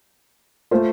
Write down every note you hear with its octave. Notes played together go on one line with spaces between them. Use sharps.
A3 F4 C5